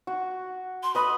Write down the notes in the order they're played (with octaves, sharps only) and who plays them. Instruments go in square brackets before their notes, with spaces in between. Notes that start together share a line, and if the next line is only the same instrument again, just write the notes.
[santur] F#4
[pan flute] C6
[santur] B4 D#5 [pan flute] B5